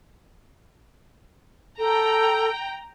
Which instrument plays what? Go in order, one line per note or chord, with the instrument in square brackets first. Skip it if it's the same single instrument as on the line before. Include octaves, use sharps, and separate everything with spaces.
[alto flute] A4 [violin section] G5 A#5